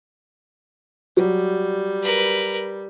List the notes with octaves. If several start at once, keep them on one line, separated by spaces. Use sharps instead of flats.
F#3 G3
A#4 B4